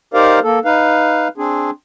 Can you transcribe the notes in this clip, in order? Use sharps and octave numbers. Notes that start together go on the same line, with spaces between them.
D#4 G4 A#4 C5 D5 F5
A#3 A4
D#4 B4 F5
C4 D4 G#4